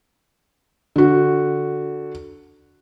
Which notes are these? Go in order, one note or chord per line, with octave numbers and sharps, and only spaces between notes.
D3 F#4